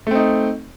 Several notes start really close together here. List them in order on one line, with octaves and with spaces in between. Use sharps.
A3 C4 D#4